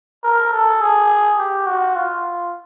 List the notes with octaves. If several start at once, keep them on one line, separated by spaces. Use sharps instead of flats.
A#4
A4
G#4
G4
F#4
F4